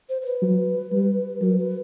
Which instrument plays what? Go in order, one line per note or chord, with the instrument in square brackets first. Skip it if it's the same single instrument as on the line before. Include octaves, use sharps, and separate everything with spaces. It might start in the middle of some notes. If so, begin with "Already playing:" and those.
[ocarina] C5
C5
B4
[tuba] F#3
G3
[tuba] F#3 [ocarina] A#4
[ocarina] B4